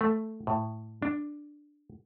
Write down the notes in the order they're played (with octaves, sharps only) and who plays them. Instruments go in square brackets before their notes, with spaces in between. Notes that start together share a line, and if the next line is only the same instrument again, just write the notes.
[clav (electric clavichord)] A3
A2
D4